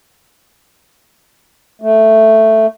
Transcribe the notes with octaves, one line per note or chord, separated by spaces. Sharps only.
A3